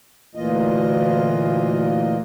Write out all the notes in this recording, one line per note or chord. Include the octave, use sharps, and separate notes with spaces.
D2 A#2 E3 A#3 F4 D#5